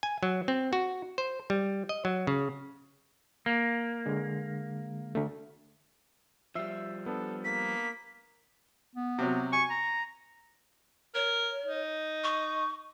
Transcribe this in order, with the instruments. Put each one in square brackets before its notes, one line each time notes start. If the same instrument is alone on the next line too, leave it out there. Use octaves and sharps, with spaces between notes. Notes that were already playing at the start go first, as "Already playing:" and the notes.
[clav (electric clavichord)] G#5
F#3
C4
F#4
C5
G3
D#5
F#3
C#3
[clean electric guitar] A#3
[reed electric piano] D3 G#3
D3 A3
[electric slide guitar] F3 G3 [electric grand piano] E5 E6 C7
[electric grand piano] B3 D4 [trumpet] A4
[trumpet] A#3 [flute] B6
[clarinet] B3
[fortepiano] C3 F#3
[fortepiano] G#5 [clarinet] C#6
[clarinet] A#5
[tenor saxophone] A#4 [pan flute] C#5
[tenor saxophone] D#4
[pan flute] C#6